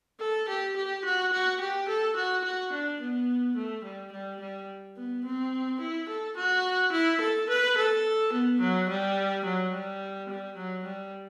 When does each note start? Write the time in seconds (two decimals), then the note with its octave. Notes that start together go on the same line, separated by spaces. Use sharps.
0.20 A4
0.48 G4
0.76 G4
1.05 F#4
1.32 F#4
1.60 G4
1.88 A4
2.16 F#4
2.44 F#4
2.72 D4
3.01 B3
3.56 A3
3.84 G3
4.12 G3
4.40 G3
4.96 B3
5.25 C4
5.80 E4
6.08 A4
6.36 F#4
6.92 E4
7.21 A4
7.49 B4
7.77 A4
8.32 B3
8.60 F#3
8.89 G3
9.45 F#3
9.72 G3
10.29 G3
10.57 F#3
10.84 G3